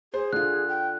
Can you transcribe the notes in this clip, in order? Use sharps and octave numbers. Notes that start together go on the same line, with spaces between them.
G#4 C5
D3 F4 F#6
G5